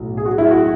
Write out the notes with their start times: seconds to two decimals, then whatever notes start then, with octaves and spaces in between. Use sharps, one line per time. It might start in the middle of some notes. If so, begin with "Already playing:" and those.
Already playing: B1 A2
0.17 G#4
0.25 F#4
0.38 E4
0.51 F#4